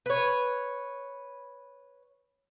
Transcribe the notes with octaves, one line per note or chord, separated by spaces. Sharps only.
B4 C#5